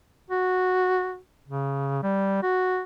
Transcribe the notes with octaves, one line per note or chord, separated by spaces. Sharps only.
F#4
C#3
G3
F#4